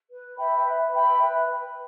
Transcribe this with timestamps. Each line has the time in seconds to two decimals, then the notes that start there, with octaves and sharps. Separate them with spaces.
0.09 B4
0.37 E5 G5 B5
0.65 B4
0.93 E5 G5 B5
1.22 B4